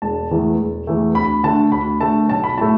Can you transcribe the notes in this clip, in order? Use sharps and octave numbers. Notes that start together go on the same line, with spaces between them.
E1 A5
E2 E3 A3
E1
E2 E3 A3
D2 B5
D3 A3 A5
D2 B5
D3 A3 A5
B1 A5
B5
A2 A3 A5